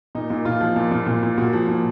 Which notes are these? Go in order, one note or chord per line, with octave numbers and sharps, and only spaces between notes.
A#2 D#4
A#2
A#2 F4
F3
A#2
A#2
A#2
A#2
A#2 F#4
F3
A#2